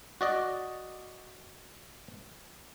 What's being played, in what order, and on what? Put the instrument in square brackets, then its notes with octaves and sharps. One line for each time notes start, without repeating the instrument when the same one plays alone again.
[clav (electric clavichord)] F#4 D5 D#5